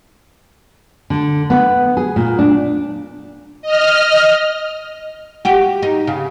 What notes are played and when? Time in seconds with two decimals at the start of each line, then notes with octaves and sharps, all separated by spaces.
1.10 D3
1.50 B3
1.97 G#4
2.16 A#2
2.39 D4
3.62 D#5 F6
5.45 F#4 G4
5.83 D#4
6.07 C#3